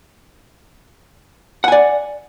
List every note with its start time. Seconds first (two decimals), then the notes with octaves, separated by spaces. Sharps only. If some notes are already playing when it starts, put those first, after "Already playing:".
1.64 F#5
1.68 G#5
1.72 D5